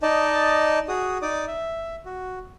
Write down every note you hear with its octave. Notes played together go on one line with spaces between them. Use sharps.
D#4 D5 D#5 A5
F#4 G#4 D#6
D#4 D5 D6 D#6
E5
F#4